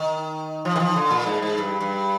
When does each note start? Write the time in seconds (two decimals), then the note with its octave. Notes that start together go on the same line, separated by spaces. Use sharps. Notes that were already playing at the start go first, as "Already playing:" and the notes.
Already playing: D#3
0.65 F3
0.76 D#3
0.80 F3
0.96 D3
1.10 A#2
1.26 G#2
1.42 G#2
1.58 G2
1.81 G2